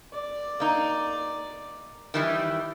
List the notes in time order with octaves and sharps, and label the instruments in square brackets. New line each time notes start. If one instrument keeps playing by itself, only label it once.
[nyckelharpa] D5
[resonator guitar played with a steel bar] A#3 D#4
D#3 E3 G3